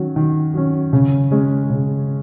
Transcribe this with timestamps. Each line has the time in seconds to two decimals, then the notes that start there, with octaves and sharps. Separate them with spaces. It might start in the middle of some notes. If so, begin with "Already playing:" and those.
Already playing: D#3 F#3 C#4
0.16 D#3
0.54 F#3 C#4
0.93 C#3
1.31 G#3 C#4
1.70 C#3